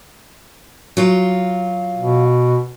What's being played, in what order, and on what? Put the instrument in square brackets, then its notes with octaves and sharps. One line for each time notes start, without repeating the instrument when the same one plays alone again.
[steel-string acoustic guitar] F#3 F4
[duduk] B2